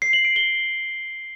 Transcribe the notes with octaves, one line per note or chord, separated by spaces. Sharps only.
C7
F#7
D7
G7